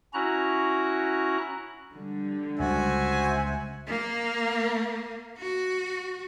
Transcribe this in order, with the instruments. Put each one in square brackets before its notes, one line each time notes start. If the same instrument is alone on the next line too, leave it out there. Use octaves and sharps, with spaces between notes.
[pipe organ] C#4 E4 F#4 A#5 F#6
[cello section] D3 G3
[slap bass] C#2 [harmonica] F#4 [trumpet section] C5 E5 G#5
[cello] A#3
F#4